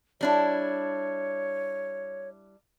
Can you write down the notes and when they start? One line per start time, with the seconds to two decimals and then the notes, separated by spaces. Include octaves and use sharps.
0.21 G3 D4 E4 C#5